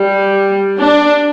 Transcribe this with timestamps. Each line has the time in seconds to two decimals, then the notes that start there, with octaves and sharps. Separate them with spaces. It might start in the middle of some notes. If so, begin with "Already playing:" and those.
Already playing: G3
0.78 D4